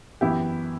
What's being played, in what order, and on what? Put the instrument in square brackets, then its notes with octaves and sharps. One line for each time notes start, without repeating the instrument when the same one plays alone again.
[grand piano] F#2 E3 B3 E4 G4